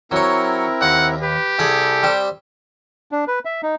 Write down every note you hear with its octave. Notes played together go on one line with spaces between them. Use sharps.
F#3 C4 E4 A#4 C#5
D#2 F#5
G4 B4
C2 G#4 A4 B5
G3 C4
D4
B4
E5
D#4